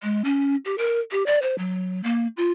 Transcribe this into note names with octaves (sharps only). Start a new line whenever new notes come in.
G#3
C#4
G4
A#4
G4
D5
C5
F#3
A#3
F4